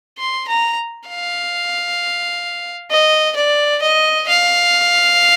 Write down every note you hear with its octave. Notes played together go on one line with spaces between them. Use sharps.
C6
A#5
F5
D#5
D5
D#5
F5